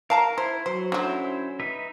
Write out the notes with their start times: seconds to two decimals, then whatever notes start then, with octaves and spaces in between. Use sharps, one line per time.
0.10 A#4 F5 A5 A#5
0.38 E4 C5
0.66 F#3 C5
0.92 D3 F#3 C#4 E4 C5
1.60 D#4 B4 E5